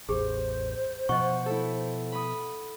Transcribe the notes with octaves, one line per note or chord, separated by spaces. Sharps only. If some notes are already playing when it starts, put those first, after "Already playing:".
A1 E2 G4 G#4 C5
B2 F3 D#5 F#5 C#6
E4 A4
B5 D#6